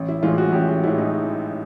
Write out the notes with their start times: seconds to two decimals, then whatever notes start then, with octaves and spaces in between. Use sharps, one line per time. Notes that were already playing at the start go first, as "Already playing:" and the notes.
Already playing: A1
0.08 E4
0.22 A2 E3 G#3 F4
0.38 F#4
0.52 A1 G4
0.68 F#4
0.83 A2 E3 G#3 E4
0.98 D#4